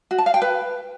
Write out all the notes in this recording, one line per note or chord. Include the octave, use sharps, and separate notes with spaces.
F#4
A5
F5
G5
B4